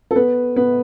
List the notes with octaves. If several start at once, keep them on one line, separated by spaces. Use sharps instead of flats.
A4
B3 B4
B3 B4